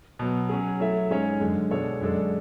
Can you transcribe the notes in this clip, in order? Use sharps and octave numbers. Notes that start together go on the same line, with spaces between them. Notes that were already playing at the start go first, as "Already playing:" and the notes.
B2 F#3 B3
F#3 C#4 G#4
F#3 A3 E4 A4 E5
G#2 G#3 C#4 G#4 C#5
F#2 D3 G#3
B2 G#3 D4 A4 C#5
F#2 D3 G#3 D4 A4